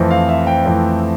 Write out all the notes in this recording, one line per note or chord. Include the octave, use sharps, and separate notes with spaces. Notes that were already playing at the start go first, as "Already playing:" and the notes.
Already playing: F2 E3 A3 C4
F5
E5
G5
F2 E3 A3 C4